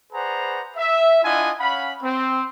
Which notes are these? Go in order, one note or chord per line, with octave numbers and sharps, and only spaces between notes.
G#4 B4 C5 D5 F#5 A#5
E5
D4 E4 F4 D#5 F#5 G#5
C#4 F5 F#5 B5
C4